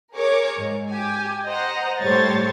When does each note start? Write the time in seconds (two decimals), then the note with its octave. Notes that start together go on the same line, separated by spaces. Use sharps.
0.12 G#4 A#4 C#5 D6
0.59 G#2
0.91 G4 G#5
1.46 C5 D#5 F#5 A#5
2.00 A2 G3 A3 C5 C#5 A6